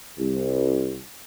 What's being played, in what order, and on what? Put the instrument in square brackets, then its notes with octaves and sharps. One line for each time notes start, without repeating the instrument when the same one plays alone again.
[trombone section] C2